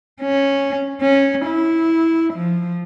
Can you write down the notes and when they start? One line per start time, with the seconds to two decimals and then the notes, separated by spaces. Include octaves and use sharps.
0.22 C#4
1.01 C#4
1.46 E4
2.34 F3